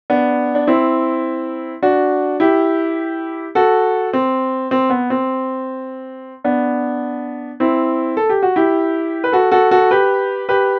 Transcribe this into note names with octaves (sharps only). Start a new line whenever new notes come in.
B3 D4
D4
C4 E4
D4 F#4
E4 G4
F#4 A4
C4
C4
B3
C4
B3 D4
C4 E4
A4
G4
F#4
E4 G4
B4
F#4 A4
F#4 A4
F#4 A4
G4 B4
G4 B4